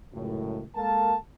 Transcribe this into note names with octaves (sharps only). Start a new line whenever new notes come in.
C#2 F#2 A2
G#3 A#3 A4 A#4 F5 A5